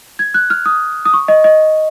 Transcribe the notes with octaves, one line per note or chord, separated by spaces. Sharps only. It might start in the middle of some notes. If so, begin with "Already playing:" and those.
G#6
F#6
F6
D#6
D#6
C#6
D#5
D#5